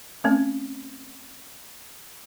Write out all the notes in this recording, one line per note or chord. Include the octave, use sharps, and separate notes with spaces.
A3 C4 C#4